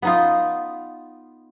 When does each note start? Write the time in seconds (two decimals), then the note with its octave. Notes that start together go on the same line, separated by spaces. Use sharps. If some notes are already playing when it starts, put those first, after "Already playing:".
0.02 B3 D#4 F4